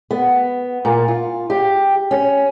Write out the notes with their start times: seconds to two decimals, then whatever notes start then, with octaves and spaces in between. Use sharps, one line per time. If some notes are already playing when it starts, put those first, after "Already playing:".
0.11 B3
0.85 A#2
1.08 F4
1.50 G4
2.11 C#4